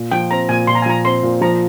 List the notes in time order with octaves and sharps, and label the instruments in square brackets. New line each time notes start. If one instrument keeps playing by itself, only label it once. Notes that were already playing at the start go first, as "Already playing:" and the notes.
Already playing: [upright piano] A#2
[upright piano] F3 [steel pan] G5
[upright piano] C4 [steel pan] A#5
[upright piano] A#2 [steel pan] G#5
[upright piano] A#2 [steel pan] C6
[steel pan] A#5
G#5
[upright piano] F3 [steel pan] A#5
[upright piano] C4 [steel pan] C6
[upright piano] A#2
[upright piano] F3 [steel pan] A#5